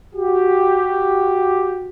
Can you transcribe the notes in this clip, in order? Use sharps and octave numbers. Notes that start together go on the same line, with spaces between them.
F#4 G4